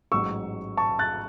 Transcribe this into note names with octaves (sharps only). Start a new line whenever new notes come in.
A1 G#2 F#3 C#6 E6
A5 C#6
F#6 A6